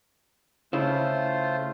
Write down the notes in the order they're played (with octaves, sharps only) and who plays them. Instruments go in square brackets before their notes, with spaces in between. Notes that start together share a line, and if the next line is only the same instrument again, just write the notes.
[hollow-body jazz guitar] C#3 E4 [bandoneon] A3 F4 C5